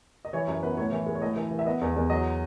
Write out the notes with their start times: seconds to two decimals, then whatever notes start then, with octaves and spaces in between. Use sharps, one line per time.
0.25 D#5
0.33 E3 C#5
0.48 F#2 C#5
0.63 B3 B4
0.77 A2 C#5
0.92 E3
1.06 G#3
1.15 C#5
1.22 A2 D#5
1.36 E3
1.51 E3
1.59 E5
1.66 B3 D#5
1.81 E2
1.96 E2
2.10 F#3 D#5